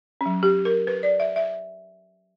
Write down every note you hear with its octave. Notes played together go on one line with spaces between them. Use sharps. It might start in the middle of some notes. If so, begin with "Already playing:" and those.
F#3 C#4
G4
A#4
B4
D5
E5
E5